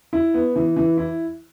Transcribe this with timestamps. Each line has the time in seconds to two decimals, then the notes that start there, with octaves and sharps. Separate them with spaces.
0.13 E4
0.34 B3
0.56 E3
0.76 E3
0.97 E4